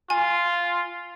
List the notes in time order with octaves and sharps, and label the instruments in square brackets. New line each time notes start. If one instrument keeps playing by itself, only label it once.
[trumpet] F4 [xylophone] G#5